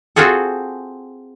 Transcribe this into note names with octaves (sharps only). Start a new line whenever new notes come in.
C4 F4 F#4 G#4 A4